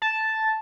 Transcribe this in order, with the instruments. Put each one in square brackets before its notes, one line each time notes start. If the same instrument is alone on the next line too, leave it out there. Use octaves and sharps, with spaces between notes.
[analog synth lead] A5